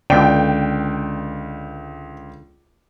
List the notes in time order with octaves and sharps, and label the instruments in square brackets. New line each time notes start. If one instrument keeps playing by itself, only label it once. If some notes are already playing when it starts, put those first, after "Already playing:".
[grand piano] C#2 D5 [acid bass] D3 [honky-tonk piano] G5